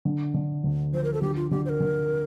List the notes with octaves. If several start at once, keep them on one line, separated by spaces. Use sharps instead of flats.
D3
D3
D2
F3 C5
A#4
A4
D3 G4
F4
D3 G4
C5
A#4
D3